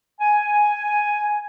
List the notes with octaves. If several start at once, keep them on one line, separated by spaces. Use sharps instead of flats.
G#5